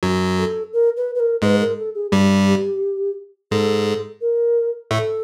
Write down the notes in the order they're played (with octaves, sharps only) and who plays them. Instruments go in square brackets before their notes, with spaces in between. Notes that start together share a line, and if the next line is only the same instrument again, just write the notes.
[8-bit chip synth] F#2 F#3
[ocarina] A4
A#4
B4
B4
A#4
[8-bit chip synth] G#2 G#3 [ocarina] B4
[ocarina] A#4
A4
G#4
[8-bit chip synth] G2 G3 [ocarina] G4
[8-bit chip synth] G#2 G#3 [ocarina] A4
[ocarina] A#4
[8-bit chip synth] A2 A3 [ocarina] A4